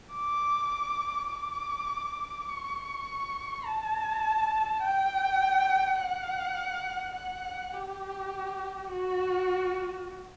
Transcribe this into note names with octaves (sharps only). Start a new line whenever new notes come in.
D6
D6
C#6
A5
G5
F#5
F#5
G4
F#4